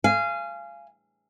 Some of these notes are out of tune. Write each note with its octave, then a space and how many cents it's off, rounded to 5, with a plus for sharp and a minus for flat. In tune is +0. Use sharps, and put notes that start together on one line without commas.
F5 -25 G#5 +0